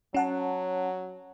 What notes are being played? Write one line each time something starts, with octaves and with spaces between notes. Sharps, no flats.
F#3 C#4 F#5 A5